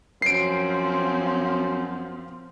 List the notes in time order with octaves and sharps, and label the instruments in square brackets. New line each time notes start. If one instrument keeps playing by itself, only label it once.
[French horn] F#2 [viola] F3 C4 [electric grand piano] C7 D7